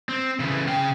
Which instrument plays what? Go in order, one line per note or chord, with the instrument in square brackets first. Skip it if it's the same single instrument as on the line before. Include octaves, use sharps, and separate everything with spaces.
[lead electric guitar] C4
C#3 E3
[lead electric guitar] C#3 F5 [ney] G5